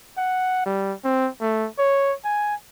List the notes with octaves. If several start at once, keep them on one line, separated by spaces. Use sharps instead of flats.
F#5
G3
C4
A3
C#5
G#5